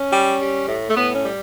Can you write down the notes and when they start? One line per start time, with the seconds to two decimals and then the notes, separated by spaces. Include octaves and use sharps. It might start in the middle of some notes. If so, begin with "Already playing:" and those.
Already playing: C#4
0.13 G3
0.41 G3
0.68 A2
0.89 A3
0.96 A2 B3
1.14 C#4
1.25 G3